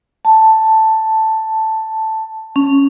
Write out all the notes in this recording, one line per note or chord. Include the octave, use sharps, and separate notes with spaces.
A5
C#4